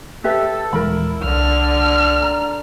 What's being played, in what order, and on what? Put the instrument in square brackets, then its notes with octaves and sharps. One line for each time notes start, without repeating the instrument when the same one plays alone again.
[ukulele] G4 B4 E5 [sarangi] A4
[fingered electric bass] D#1 E3 G#3 [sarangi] E4 [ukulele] A#4 B5
[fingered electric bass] C2 [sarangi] D3 [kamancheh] F6
[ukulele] A#5